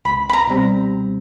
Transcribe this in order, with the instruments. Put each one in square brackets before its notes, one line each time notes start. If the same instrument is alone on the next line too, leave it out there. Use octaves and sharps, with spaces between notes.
[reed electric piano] C#2 [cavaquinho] B5
[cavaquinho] B5
A#5
[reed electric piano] B2 G3 C4